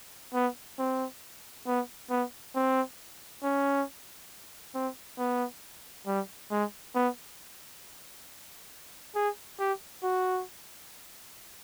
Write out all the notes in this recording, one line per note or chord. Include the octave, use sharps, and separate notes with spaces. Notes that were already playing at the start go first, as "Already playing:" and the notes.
B3
C4
B3
B3
C4
C#4
C4
B3
G3
G#3
B3
G#4
G4
F#4